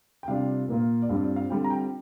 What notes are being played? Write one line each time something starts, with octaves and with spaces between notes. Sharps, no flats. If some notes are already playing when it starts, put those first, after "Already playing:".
G5
C3 G3 D4 F4 F5
A#2 A#3 F4
D5
G2 G3 C4 F4 F5
D5
F5
D3 G3 C4 F4 G5
A#5
G5